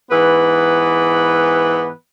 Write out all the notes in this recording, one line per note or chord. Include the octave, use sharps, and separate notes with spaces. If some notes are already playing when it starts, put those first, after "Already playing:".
G#2 E3 B3 B4